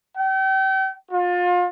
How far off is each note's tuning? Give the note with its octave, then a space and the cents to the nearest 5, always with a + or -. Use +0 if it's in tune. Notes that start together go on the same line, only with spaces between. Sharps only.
G5 -40
F4 +30